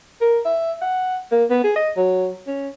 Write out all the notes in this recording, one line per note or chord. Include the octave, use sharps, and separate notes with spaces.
A#4
E5
F#5
A#3
B3
G#4
D#5
F#3
C#4